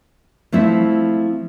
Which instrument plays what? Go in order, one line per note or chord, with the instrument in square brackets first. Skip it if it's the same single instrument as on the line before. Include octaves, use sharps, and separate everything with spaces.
[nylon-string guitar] F3 A3 C4 E4